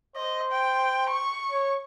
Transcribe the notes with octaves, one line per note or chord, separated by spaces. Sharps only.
C5 D#5
G5
C#6
C#5